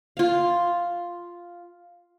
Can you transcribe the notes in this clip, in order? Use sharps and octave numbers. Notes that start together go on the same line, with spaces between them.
F4 F5